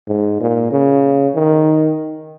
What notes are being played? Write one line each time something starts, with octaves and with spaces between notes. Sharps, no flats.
G#2
A#2
C#3
D#3